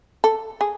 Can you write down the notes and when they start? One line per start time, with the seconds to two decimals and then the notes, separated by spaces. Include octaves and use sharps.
0.24 A4
0.61 G#4